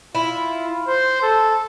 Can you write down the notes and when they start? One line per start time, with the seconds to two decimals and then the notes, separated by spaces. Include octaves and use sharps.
0.15 E4 F4
0.87 C5
1.22 A4